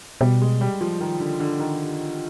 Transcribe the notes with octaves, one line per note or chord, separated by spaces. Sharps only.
B2 G3
G#3
G3
F3
D#3
D3
D3
D#3